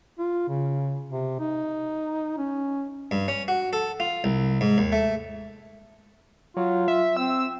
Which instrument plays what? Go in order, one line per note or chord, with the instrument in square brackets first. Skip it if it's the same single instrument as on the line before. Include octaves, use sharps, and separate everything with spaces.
[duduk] F4
C#3
C3
D#4
C#4
[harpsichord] G2
C#4
F#4
A4
F4
C2
G#2
D#2
A3
[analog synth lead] F#3 [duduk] F4
[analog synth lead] E5
[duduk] C4 [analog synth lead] E6